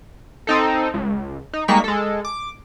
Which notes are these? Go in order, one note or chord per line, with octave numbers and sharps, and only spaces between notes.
C4 D#4 A4
C#2
D#4
G3 G#3 A#3 D#4 C#6 B6
G#3 A4
D6